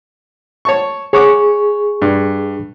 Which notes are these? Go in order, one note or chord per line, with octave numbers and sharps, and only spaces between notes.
C#5 A5 C#6
G#4 C#5 F#5 C#6 D6
G2